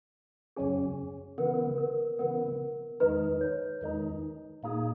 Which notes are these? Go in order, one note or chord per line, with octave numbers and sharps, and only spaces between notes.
F#2 C#3 F#3 C#4 G#4
C#3 E3 B3 A#4
B4
A#4
A#4
C#3 E3 B3 A#4
E2 D#3 G#3 D#4 B4
C#5
E2 D#3 G#3 D#4
A#2 A#3 D#4 G#4